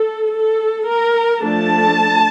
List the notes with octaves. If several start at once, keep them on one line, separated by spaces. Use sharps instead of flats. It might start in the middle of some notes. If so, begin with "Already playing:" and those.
Already playing: A4
A4
A#4
F3 A3 D4 A5